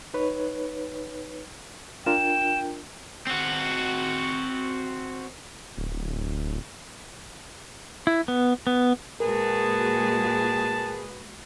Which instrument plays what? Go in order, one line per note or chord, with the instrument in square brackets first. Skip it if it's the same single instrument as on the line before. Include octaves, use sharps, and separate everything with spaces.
[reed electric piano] D#4 B4 C#5
[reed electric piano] D4 F4 A#4 [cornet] G5 [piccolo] E7
[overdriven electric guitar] C4 F#4
[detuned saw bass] D1
[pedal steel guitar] E4
B3
B3
[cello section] A#2 G#3 F#4 [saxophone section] G#4 B4 [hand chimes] A#4 [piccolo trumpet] A5